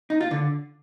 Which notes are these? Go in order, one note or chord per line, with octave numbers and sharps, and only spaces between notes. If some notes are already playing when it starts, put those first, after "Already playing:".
D#4
F4
D3